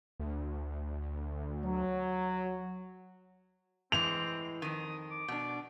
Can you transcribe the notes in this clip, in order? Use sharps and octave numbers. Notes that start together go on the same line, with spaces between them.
D2
F#3
A2 E3 G#3 C4 F7
F2 D#3 D#6
D6
B2 D4